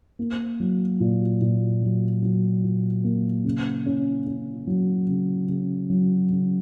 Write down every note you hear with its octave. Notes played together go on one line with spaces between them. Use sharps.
A#3
F#3
A#2
A#2
F#3
F#3
A#2
A#3
C#3
C#4
C#4
F#3
C#3
C#3
F#3
C#3